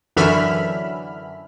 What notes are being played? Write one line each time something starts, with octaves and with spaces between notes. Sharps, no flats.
F#2 D3 E3 E5 B5 F6